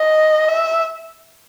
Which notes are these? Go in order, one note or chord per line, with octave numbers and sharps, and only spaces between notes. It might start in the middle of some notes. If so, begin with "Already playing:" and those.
Already playing: D#5
E5